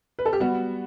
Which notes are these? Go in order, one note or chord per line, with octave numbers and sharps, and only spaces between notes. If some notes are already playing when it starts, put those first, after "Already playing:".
B4
A4
G4
G3 B3 F#4